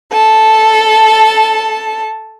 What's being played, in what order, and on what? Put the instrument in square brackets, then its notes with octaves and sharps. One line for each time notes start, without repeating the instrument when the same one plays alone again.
[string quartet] A4 A5